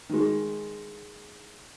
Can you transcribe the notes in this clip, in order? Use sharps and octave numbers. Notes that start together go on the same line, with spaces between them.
D#3 G#3